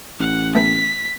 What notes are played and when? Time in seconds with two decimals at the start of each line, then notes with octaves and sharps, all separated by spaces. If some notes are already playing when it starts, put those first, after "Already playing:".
0.20 A1 F#5
0.55 A3 B3 G5 B6